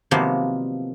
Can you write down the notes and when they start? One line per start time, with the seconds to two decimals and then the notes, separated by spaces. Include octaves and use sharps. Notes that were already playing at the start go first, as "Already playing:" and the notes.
0.11 C3 D#3 F3 F#3 A#3 B3